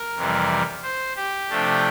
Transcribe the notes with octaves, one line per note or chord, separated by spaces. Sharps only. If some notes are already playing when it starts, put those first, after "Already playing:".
Already playing: A#4
F2 C3 E3 G3
C5
G4
C3 F3 A3 D4